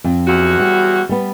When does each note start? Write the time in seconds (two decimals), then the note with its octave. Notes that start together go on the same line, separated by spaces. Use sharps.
0.04 F2
0.27 E2 F#3 F#4
0.59 G3
1.09 G3 B3